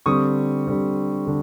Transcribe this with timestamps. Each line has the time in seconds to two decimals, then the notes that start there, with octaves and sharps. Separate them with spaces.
0.06 D3 G3 C4 C#6 D#6
0.67 D3 G3 C4
1.27 D3